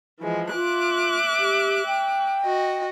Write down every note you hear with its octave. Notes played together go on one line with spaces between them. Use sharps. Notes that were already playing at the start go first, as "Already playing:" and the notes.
E3 F3 G#3
F4 E5 D6 F#6
G4
G5
F#4 D#5